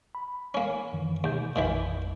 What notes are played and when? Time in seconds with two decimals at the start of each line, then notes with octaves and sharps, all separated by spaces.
0.15 B5
0.54 A#3 C#4
0.93 F#2 D#3 E3
1.24 D#2 B2 G6
1.56 A1 F2 A#2 D#3 E3